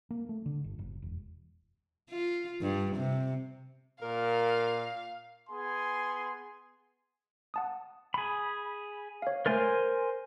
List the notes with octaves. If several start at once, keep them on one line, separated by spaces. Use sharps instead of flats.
A#3
A3
D3
G1
F#1
E1
F4
G2
C3
A#2 A#4 F5
B3 G#4 G#5 C6
F#5 A5 D#6
G#4 B5
C#5 F5
A3 A#4 C5 G#5 A6